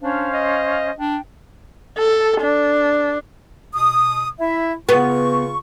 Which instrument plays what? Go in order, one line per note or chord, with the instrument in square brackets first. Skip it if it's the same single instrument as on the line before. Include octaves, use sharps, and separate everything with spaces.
[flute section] C#4 C5 F5 [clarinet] D4
[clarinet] D#5
[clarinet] D4 [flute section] G5
[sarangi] A4
D4
[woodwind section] B2 D#6
E4 E5
[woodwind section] C#3 F4 C#6 [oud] B3